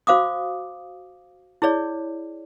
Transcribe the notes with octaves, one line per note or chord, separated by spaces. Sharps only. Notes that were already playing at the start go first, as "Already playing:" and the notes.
F#4 C5 F5 D6 D#6
E4 G#4 C#5 D5